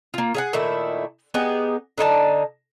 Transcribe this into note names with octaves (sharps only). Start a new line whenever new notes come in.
A#3 F4
G#4 F5 F#5
A#2 D#3 A3 E4
B3 D#4 G4 G#4
D3 D#4 B4 A5